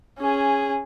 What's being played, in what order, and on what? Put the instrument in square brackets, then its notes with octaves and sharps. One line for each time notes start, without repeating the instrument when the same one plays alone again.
[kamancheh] C#4 G#4